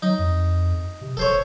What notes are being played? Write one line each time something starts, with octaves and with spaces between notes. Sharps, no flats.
F#3 D#4
F2
C3
D#1 A4 C5 C#5